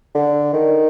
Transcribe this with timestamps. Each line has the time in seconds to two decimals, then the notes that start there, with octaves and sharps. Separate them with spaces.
0.15 D3
0.54 D#3